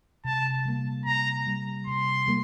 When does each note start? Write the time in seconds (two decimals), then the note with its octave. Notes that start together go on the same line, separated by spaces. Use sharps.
0.25 C3 A5
0.65 G3 A#3
1.06 C3 A#5
1.46 G3 A#3
1.87 C3 C6
2.27 G3 A#3